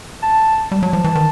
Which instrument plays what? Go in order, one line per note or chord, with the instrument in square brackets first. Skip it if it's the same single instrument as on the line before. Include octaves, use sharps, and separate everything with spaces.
[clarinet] A5
[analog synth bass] G3 [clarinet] A5
[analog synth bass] F#3
F3
E3
D#3